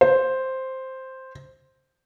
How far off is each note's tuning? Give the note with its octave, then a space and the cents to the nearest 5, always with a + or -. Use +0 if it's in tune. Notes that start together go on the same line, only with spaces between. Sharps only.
C5 +0